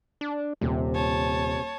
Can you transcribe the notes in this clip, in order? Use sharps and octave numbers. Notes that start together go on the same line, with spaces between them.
D4
D#1 C3
C#5 A5